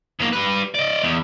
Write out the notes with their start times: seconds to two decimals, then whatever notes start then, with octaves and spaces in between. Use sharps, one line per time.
0.20 F2 A#3
0.33 G3 B4
0.74 D5 D#5
1.03 E2